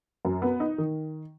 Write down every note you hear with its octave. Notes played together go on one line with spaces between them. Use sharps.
F#2
B3
D#4
D#3